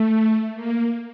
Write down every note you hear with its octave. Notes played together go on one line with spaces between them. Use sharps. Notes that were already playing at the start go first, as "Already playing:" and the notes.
Already playing: A3
A#3